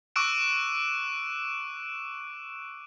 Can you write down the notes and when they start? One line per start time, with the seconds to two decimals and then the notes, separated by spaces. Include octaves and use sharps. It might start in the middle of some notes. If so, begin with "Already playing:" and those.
0.16 C#6 D6 E6 F#6 D7 E7